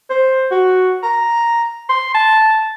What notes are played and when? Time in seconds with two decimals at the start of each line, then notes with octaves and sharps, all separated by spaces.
0.10 C5
0.51 F#4
1.03 A#5
1.89 C6
2.15 A5